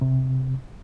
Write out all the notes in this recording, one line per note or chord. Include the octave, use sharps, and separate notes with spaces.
C3